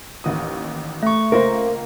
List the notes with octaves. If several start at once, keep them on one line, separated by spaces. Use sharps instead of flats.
A1 D#2 D#6
A3 C#6
C#2 A#3 A#4 C5 A#6